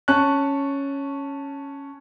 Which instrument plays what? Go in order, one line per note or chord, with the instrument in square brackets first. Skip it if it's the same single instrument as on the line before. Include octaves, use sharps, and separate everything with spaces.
[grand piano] C#4 A5 C#6 F#6